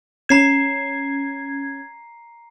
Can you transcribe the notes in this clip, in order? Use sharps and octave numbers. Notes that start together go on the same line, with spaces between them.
C#4 A#5 G#6 C7 E7